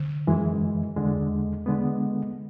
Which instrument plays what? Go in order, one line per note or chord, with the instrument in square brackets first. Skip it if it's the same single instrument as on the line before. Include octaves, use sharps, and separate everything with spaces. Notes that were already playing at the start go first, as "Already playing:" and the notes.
Already playing: [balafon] D3
[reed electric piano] F#2 E3 G#3
E2 D3 G#3
D3 G#3 B3